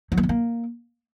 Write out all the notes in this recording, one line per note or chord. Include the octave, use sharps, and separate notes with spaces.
F#3
A#3
B3
A#3